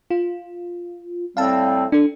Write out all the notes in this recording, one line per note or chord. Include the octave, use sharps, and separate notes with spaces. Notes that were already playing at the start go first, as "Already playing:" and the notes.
F4
A2 G3 C4 F5 A5
D4 A4